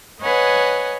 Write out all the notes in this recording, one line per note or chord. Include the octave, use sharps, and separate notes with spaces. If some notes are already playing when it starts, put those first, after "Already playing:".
B4 C#5 D#5 F#5 G#5